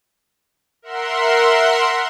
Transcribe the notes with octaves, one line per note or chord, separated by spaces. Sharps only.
A#4 E5 F#5 C6